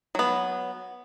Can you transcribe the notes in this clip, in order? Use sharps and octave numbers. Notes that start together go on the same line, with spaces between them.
F#3 B3